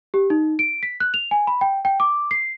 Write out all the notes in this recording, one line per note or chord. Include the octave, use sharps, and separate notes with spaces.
G4
D#4
D7
B6
F#6
F7
G#5
B5
G5
G5
D6
C7